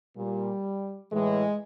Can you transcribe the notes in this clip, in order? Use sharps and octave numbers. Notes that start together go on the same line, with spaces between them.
A#2 G3
A2 E3 G#3